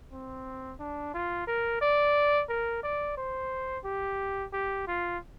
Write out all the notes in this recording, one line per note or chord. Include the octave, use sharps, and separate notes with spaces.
C4
D4
F4
A#4
D5
A#4
D5
C5
G4
G4
F4